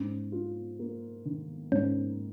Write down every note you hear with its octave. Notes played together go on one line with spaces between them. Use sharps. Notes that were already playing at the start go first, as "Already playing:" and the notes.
Already playing: G#2 C#4
F4
A#3
D#3
G#2 C#4